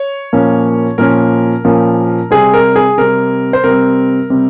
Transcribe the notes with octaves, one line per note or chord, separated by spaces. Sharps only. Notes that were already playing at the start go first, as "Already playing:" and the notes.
Already playing: C#5
A#2 F3 A#3 C#4
A#2 F3 A#3 C#4 A#4
A#2 F3 A#3 C#4
C3 G3 C4 G#4
A#4
G#4
C3 G3 C4 A#4
C5
C3 G3 C4 A#4
C3 G3 C4